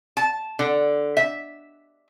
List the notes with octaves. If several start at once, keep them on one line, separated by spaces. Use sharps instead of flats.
A5
D3
E5